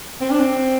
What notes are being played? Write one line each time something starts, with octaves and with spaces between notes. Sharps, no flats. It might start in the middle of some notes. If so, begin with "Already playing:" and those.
C4
D4
C4